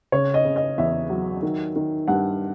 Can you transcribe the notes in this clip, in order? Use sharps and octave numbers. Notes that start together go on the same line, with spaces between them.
C#3 C#5
D#5
C#3
D#5
E2 E5
F#3
D#3
D#3
G2 F#5